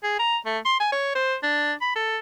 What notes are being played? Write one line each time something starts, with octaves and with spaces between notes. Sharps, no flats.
G#4
A#5
A3
C6
G#5
C#5
C5
D4
B5
A4